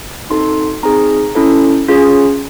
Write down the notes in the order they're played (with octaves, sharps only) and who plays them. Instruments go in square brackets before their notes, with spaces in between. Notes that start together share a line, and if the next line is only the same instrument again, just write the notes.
[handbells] C4 D#4 F#4 A4 C6
C4 D#4 G#4 A#5
C#4 E4 A4
C#4 F4 G#4